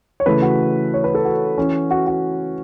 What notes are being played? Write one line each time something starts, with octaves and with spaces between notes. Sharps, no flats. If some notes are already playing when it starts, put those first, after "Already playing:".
C#5
C#3 E3 A3 B4
F#4
C#5
B4
A4
F#4
E3 C#4
F#4
F#4